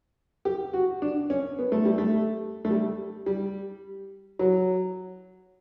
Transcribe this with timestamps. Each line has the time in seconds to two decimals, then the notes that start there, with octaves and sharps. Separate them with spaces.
0.45 G4
0.73 F#4
1.02 D4
1.30 C#4
1.59 B3
1.72 A3
1.85 G3
1.98 A3
2.65 A3
2.71 G3
3.26 G3
4.39 F#3